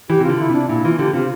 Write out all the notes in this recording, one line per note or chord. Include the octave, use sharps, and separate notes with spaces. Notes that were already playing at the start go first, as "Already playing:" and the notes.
E3 G4
C3
F4
D3
E4
C3 D4
A#2 E4
E3 F4
D3 G4
C3 F4